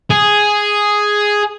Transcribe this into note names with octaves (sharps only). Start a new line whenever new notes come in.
G#4